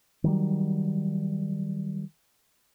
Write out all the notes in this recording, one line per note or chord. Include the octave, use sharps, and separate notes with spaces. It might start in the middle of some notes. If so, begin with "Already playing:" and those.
D#3 F#3 G3